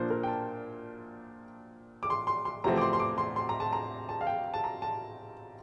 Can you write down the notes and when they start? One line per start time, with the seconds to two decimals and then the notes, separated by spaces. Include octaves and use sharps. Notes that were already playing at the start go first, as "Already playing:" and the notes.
Already playing: A#2 F3 A#3 D4 C5
0.10 A#4
0.23 G5
0.28 A5
2.03 D6
2.10 C6
2.27 C6
2.45 C6
2.64 E2 C3 F3 A3 C4 A#5
2.78 D6
2.81 C6
2.93 C6
3.00 D6
3.18 C6
3.36 C6
3.49 A#5
3.60 A5
3.73 A#5
4.09 A5
4.21 F5
4.27 G5
4.54 A5
4.64 A#5
4.82 A5